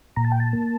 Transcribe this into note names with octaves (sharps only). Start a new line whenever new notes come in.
A#2 A#5
A5
G5
A5
A#3